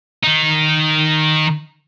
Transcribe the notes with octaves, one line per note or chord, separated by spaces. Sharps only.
D#3 D#4